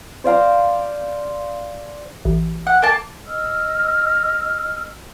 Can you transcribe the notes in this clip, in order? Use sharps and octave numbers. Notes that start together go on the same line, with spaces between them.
C5 D5 F5 A#5
A1
F#5
A#3 A5
D#5 E6 F6